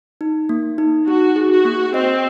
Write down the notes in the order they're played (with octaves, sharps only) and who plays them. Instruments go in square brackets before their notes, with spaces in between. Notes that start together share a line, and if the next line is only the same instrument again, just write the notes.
[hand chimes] D#4
A#3
D#4
[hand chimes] D#4 [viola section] F#4
[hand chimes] G#4
[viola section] F#4
[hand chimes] A#3
[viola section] C4 [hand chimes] D#5